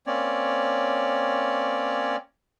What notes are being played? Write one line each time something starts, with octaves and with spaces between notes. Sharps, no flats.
A#3 C4 C#4 C#5 D5